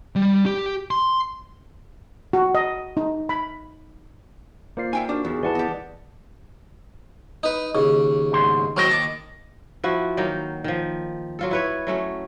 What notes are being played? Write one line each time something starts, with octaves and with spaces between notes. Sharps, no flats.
G3
G4
C6
F#4
D#5
D#4
B5
A#3 F4 C5 D5 C7
D#4 E5 G5 G#5
D4 F#4 A#4
E2 G4 G#4
E3 B3 D5 F#5 A5
G4 D#5
D#4 B4
D#2 C#3
E2 G#2 C6
D#2 F#3 A#4 C5 D#5 G5
A5 C#6 D6
F3 E4 F#4
D#3 F#3 A#3 D#4
D#3 F3
F#3 F4 A4
E4 B4 C#5
F#3 A3 C#4